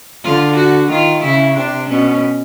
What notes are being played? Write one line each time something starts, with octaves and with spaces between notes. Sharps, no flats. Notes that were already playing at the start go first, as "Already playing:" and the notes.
D3 F4
F#4
D#3 F4
C#3 E4
C3 D4
B2 C#4